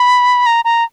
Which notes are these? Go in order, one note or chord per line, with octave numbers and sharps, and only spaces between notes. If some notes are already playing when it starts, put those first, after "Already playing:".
Already playing: B5
A#5
A#5